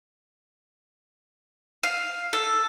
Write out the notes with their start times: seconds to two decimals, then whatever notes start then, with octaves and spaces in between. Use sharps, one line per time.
1.83 F5
2.33 A4